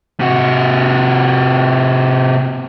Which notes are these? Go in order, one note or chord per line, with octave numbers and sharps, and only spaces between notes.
C3 F#4